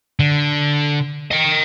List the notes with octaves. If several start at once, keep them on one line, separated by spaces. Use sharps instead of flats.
D3
D#5 G5